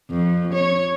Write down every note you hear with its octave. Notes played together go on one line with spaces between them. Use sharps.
F2
C#5